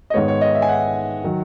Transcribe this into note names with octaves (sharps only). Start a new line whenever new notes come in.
D#5
G#2 D#3 G#3 B3 C#5
C#5
D#5
E5
G#5
F#5
D#3 F#3